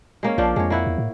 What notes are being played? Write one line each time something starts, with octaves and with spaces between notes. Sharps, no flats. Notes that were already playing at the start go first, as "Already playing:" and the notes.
G#3 A#3 C#4
A#1 F3 D4 F4
F2 G#3 C#5
A#3 E4 F#5
E2
A2